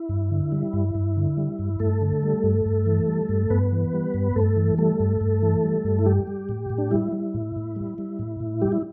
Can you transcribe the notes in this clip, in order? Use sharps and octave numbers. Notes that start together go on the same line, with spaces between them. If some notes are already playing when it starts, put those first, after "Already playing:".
Already playing: E4
G2
D3
G3
G2
G2
D3
G3
G2
G2 A3 A4
D3
G3
G2
G2
E3
G3
G2
G2 B3 B4
E3
G3
G2
G2 A3 A4
E3
G3 A3 A4
G2
G2
E3
G3
G2
E4
G3 G4
G3
A2
A2
D4
G3 E4
G3
A2
A2
G3
G3
A2
A2
G3 G4
E4